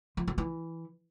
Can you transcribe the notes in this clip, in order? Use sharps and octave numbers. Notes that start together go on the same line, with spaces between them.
F3
F#3
E3